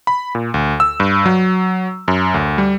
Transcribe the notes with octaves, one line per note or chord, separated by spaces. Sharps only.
B5
A#2
D2
E6
G2
F#3
F#2
D2
G3